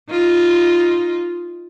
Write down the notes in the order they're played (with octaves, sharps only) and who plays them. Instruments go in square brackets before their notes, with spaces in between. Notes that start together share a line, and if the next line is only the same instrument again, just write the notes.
[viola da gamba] D#4 F4